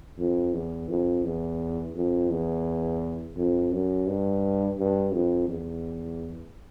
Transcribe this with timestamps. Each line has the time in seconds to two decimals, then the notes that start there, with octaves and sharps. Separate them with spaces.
0.19 F2
0.54 E2
0.90 F2
1.25 E2
1.96 F2
2.31 E2
3.37 F2
3.72 F#2
4.08 G2
4.79 G2
5.13 F2
5.49 E2